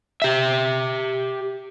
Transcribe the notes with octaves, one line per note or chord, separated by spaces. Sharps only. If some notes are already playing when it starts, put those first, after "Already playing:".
G4 E5